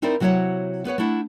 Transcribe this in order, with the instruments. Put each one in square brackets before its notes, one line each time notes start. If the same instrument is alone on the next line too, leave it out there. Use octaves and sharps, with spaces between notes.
[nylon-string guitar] C4 D#4 E4 A#4 C5 D5
C3 F#3 E4 C5 C#5 F#5
B3 B4 C#5 F#5
A3 D4 E4 F#5